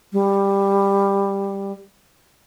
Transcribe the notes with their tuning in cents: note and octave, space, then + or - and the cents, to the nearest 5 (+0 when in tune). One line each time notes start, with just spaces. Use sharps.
G3 +10